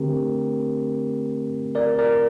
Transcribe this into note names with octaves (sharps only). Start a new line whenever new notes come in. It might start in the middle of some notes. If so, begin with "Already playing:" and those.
Already playing: D3 A3 C4 G4 A#4
A#4 D5
A#4 D5